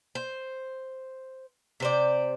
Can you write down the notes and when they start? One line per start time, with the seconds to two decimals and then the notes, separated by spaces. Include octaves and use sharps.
0.15 C5
1.80 C3 C5 D5